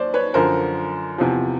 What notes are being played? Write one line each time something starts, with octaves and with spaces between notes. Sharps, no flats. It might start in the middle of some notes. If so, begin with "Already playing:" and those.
Already playing: D#2 C5 D5
B4 C#5
F#2 D3 F3 A#4 C5
E2 C3 F3